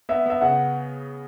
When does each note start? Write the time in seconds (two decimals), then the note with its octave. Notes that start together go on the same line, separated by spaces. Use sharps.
0.09 B3 E5
0.26 B3 E5
0.41 C#3 F#5